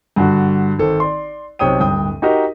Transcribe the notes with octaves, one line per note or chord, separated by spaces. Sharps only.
G2 D3 F#4
G#1 A4 C5
D5 C6
B1 C3 C#5 G5 D#6 D#7
D1 G2 G5 D#6
D#4 F#4 G4 A#4 D#5